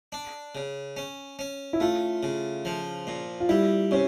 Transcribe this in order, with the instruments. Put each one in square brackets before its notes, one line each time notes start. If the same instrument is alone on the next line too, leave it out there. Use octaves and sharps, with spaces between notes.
[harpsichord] D4
C#3
C#4
C#4
[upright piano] E4
[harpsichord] A3 [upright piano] F4
[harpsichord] C#3
F3
A#2
[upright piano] F4
[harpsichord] G3 [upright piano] E4
[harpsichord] C3 [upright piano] C#4